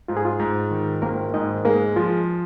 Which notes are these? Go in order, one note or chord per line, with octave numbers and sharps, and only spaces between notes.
G#2 F4
G#4
F4
G#2
D#3
G#1 A#3 A#4
G#2 D#4 D#5
G#3 A#3 A#4
F3 F4